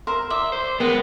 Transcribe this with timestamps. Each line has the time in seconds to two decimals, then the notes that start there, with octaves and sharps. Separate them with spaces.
0.07 A#4 C5 E5 C6
0.30 E5 D6
0.52 C5
0.80 G#3 B3 A#4 G5